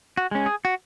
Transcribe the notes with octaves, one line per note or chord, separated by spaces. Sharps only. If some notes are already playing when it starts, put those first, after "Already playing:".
F#4
G#3 C#4
G#4
F#4